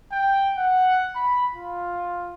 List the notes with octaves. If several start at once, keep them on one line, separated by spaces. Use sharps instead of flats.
G5
F#5
B5
F4